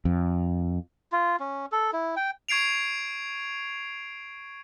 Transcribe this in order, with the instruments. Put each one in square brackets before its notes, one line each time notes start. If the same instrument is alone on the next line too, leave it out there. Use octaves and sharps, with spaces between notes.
[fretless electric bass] F2
[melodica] F4
C#4
A4
E4
G5
[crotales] C#6 G#6 C7 D7 F7